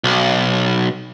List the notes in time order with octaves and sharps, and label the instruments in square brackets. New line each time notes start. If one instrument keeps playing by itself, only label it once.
[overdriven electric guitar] B1